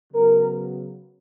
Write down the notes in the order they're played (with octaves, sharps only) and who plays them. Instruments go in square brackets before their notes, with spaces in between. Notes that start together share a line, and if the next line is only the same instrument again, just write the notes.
[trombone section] C#3 F#3 B3 A#4